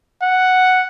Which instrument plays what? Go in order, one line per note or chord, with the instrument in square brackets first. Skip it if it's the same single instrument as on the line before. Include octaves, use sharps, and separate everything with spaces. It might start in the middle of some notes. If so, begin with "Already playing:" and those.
[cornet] F#5